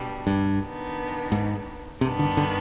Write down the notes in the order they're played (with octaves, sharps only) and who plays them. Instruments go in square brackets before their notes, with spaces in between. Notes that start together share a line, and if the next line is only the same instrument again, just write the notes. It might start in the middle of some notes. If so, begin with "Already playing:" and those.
Already playing: [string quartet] B2 G3 D4
[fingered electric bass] G2
[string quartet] D#3 B3 D4
[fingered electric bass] G#2
[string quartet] G2 D#3 B3 D4 [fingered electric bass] C3
[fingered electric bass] D3
D3